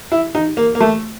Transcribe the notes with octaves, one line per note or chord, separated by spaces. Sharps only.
E4
D#4
A#3
A#3
A3